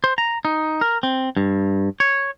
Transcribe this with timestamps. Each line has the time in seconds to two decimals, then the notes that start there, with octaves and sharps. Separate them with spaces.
0.04 C5
0.18 A#5
0.45 D#4
0.81 A#4
1.03 C4
1.37 G2
2.00 C#5